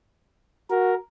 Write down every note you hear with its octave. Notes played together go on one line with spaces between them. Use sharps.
F#4 A#4